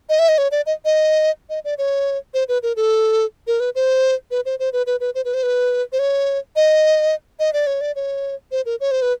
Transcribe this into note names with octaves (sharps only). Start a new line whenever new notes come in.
D#5
E5
D#5
C#5
D5
D#5
D#5
D#5
D5
C#5
C5
B4
A#4
A4
A#4
B4
C5
B4
C5
C5
B4
B4
B4
C5
B4
C5
B4
C5
C#5
D#5
D#5
D5
C#5
D5
C#5
C5
A#4
C#5
C5
B4